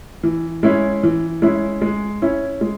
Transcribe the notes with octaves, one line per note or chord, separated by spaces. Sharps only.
E3
G#3 C#4 E4
E3
G#3 C#4 E4
G#3
C#4 E4
G#3